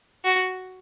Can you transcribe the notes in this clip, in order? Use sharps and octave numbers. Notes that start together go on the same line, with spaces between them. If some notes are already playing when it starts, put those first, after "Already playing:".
F#4